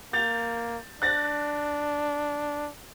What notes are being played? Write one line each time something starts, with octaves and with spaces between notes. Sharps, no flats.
A#3 G6 A6 F7
D4 F#6 A6 A#6